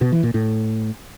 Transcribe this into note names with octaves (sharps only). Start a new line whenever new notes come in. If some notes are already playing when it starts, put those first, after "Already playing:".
B2
E3
A#2
A2